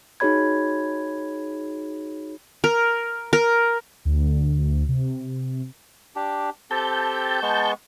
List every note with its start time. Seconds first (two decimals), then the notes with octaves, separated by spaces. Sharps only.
0.20 D#4 F#4 G#4 C#5 B5 G#6
2.64 A#4
3.33 A#4
4.05 D2
4.88 C3
6.16 D4 G4
6.71 C4 G4 A4 A5 G6
7.42 G#3 B3 C#6